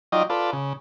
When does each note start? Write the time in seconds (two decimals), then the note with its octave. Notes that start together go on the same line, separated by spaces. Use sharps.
0.12 F#3 D#4 F4 D5 D#5 G5
0.30 F4 A4 B4 D5
0.53 C#3